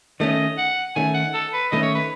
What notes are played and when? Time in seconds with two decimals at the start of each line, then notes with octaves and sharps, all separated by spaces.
0.20 D#3 A3 C#4 D#5
0.58 F#5
0.96 D#3 A3 C#4 G#5
1.14 F#5
1.34 A4
1.53 B4
1.72 D#3 A3 C#4 D#5
1.83 C#5
1.95 B4